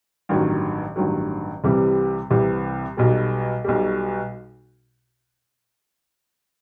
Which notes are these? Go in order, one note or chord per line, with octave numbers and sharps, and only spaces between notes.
A1 G2 D#3 F#3
A1 G2 D#3 F#3
C2 C3 E3 G3
C2 C3 E3 G3
B1 B2 G3
B1 B2 G3